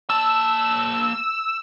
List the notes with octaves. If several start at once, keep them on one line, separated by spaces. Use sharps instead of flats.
A#3 A5 E6